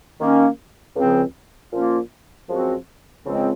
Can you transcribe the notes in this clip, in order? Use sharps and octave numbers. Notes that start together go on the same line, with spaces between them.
D#3 A#3 C#4
C#2 C#3 F3 C4
A#2 F3 A#3 C#4 F4
F#2 F3 G#3 C4 F#4
C#2 C#3 F3 G#3 C4